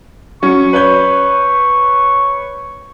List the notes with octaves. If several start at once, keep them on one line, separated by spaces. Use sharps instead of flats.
F#3 C#4 C#6
B4 C#5 G6